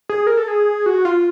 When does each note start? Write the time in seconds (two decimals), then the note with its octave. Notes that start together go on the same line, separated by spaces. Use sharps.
0.09 G#4
0.27 A#4
0.37 A4
0.48 G#4
0.86 F#4
1.05 F4